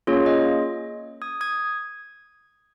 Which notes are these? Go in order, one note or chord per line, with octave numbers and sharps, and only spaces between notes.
A#3 C#4 F4 G#4 C#5
D#5
D#6 G#6
D#6 G#6